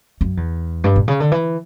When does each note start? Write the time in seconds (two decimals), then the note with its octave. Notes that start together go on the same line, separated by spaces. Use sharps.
0.21 F#2
0.37 E2
0.84 G2
0.96 A#2
1.08 C#3
1.20 D3
1.32 E3